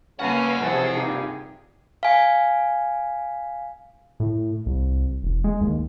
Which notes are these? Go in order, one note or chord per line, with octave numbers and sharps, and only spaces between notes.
C#3 A#3 C#4 B4 F#5 A5
A2 C3 E3 F3 G#4 A4 C5
G2 A#2 D#4 G4
F5 G#5
A2
C2
E1
G#3
D#2